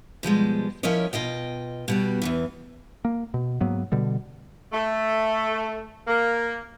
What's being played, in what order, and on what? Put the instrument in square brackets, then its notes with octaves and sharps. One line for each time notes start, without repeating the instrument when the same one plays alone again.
[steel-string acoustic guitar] B2 F3 G3 G#3
F3 C#4 E4 A#4 C#5 D#5
B2 F4 D#5 G5
B2 G3 F#4
E2 G2 E3
[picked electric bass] A#3
B2
G#2 F#3 A#3 B3
B2 D3 G3
[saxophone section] A3
A#3